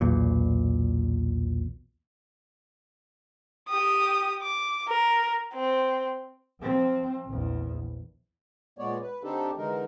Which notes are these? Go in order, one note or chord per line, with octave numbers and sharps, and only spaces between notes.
B1 E2 A#2
G4 D#6
D6
A#4
C4
F3 C4
A#1 E2
A#2 G#3 B3 C#5 D5
B4
D3 C4 D4 D#4 G4 A4
D3 E3 G#3 D#4 A#4